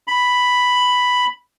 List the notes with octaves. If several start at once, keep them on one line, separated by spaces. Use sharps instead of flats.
B5